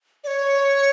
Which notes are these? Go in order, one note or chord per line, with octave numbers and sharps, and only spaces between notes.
D5
C#5